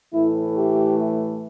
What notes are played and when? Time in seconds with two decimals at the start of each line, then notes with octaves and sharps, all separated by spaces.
0.14 A2 E3 A3 E4
0.57 G4